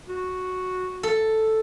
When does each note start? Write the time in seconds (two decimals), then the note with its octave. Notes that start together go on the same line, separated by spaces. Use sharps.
0.09 F#4
1.03 A4